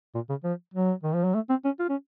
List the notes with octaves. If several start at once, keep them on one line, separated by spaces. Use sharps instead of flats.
A#2
C#3
F3
F#3
D#3
F3
F#3
A3
C4
C#4
F4
C#4